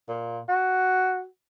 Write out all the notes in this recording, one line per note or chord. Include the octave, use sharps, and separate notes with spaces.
A#2
F#4